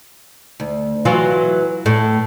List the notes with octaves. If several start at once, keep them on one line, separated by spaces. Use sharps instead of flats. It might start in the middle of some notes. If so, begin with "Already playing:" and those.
D2
E3 F#3 F4
A2